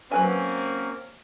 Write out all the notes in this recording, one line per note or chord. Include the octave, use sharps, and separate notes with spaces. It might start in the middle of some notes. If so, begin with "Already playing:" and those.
F#3 A#3 C4 C#4 B4 G#5